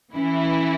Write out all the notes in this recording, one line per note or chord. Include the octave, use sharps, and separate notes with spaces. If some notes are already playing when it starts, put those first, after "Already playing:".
E3 C#4 E4